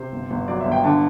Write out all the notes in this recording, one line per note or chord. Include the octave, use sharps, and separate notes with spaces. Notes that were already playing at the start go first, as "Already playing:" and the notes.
Already playing: C3 C5
G1
G1
F#3 D5
E5
G1
G5
D3 A5